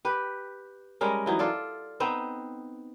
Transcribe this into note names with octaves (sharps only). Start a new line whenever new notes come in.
G4 B4
G3 G#3 C#4 A#4
E3 F#3 D#4
F4 A4 D5
B3 C4 D#4